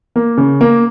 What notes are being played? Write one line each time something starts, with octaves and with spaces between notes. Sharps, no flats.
A#3
C#3
A#3